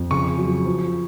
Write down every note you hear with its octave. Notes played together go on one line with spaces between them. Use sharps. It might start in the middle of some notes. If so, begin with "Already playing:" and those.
Already playing: F2
C#3 C#6
F#3
F3